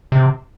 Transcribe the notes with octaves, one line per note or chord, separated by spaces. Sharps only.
C3